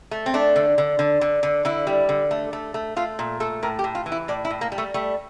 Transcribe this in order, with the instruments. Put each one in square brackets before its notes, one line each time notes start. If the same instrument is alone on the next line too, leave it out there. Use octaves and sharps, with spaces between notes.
[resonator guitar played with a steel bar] A3
C4
A3 D4
D3
D3
D3
D3
D3
D3 E4
G3
D3
A3
A3
A3
A3 F4
A#2
A3 A4
A2 A#4
G4
A2
F4
E3
E4
A2 D5
E4
A2
A#3
G3
A3
G3 A3